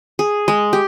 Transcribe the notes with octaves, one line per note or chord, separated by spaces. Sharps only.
G#4
G#3
G4